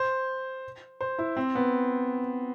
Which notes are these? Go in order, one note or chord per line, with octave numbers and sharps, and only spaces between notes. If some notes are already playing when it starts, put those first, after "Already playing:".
Already playing: C5
C5
E4
C4
B3